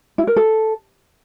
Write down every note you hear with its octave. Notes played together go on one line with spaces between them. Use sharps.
E4
A#4
A4